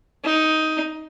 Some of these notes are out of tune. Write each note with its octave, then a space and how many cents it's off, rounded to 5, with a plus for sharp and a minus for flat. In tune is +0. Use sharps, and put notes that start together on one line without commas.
D#4 +10